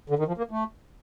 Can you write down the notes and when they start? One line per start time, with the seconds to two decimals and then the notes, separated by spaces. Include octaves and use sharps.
0.09 D3
0.19 D#3
0.27 F3
0.38 A#3
0.51 A3